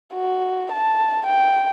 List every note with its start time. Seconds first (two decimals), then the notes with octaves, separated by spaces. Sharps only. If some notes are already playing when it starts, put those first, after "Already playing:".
0.14 F#4
0.72 A5
1.27 G5